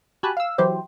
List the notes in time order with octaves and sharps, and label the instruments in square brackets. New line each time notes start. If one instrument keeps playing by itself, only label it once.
[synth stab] F#4 G4 G#5 A5 B5 F#6
F5 E6
E3 F#3 E4 G4 C5